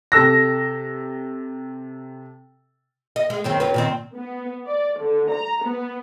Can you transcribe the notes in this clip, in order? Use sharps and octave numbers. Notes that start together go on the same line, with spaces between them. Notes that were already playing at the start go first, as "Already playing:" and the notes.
C3 A4 E6 A#6
D#5
G#3
F#2 D#3 C4
F#2 F#3 B4
A#2 D#3 C4
B3
D5
D3
A#5
B3